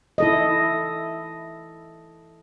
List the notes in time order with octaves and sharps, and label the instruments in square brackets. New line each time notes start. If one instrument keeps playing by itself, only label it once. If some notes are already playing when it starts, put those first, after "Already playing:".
[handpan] E4 A4 D#5